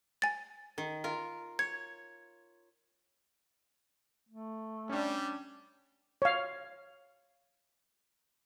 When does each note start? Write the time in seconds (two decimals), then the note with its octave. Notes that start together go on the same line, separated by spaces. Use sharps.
0.22 G#5 A6
0.78 D#3
1.04 F4 A#4
1.59 C#5 G#6
4.29 A3
4.89 G3 C#4 D4
6.22 C#5 F5